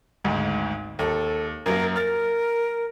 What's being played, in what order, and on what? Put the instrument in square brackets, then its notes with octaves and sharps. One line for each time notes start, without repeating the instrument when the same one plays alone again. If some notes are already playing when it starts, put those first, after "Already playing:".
[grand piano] G#1 D2 G#2
[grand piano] D#2 [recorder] A4
[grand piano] F#2 F#3 A#3 [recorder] A#4
[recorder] A#4 [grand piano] F6 A6